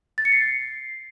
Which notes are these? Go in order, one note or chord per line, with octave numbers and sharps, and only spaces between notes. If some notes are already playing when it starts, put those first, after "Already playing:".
A6
C#7
C7